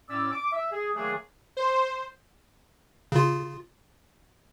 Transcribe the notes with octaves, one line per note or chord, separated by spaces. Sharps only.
A2 C#4 D5 E6
D6
E5
G#4
D#3 F#3 A3 A#3 D4 G#4
C5
C#3 F4